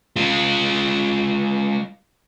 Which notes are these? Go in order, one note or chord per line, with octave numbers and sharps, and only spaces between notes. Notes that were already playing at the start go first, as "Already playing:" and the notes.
G#3 F4